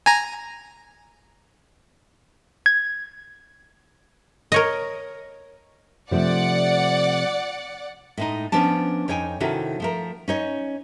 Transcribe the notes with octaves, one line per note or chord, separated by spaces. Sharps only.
G#5 A#5
G#6
A#4 C#5 D#5
C3 F3 A3 D5 F#5
A2 G#3 D#4
F3 B3 C#4 D4 A5
F2 D#4 C#5 G5 G#5
C3 D#3 C#4 E4 F#4 A4
F3 A3 A#4
C#4 D#4 C#5